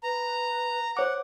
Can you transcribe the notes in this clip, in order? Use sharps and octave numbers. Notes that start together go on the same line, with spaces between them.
B4 A#5
C5 C#5 F#5 D6